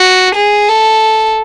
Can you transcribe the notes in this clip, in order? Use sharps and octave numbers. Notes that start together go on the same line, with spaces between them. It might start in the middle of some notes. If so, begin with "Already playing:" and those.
Already playing: F#4
G#4
A4